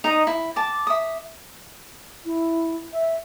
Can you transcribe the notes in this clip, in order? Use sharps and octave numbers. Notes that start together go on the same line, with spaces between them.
D#4 D#5 A#5 D#6
E4
A5 D6
E5 D#6
E4
E5